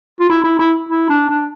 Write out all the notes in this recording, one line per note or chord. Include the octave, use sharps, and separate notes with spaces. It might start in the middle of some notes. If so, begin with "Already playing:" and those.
F4
E4
E4
E4
E4
D4
D4